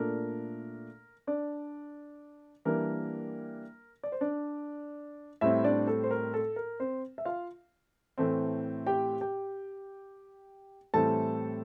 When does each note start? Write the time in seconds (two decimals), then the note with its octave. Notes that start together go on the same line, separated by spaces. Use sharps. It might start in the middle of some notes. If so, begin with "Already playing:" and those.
Already playing: A#2 A3 D4 A#4
1.27 D4 D5
2.65 E3 G3 A#3 D4 A#4
4.03 D5
4.12 C5
4.21 D4 D5
5.41 A2 G3 C4 E4 E5
5.64 D4 D5
5.87 A4
6.04 C5
6.11 A#4
6.34 A4
6.56 A#4
6.80 C4 C5
7.18 E5
7.25 F4 F5
8.18 A2 E3 A3 C4
8.87 G4 G5
9.21 G4 G5
10.94 A2 E3 G3 C4 A4 A5